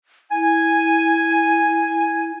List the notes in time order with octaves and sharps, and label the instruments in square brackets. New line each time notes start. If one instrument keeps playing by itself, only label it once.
[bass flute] E4 [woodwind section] G#5